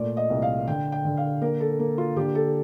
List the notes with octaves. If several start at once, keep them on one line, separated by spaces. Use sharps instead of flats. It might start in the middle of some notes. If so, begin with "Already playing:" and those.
Already playing: A#2 A3 D5
D#5
C2
F5
D3 G5
G5
D3
F5
A#3 A#4
A4
A#3
F4
D3 G4
A4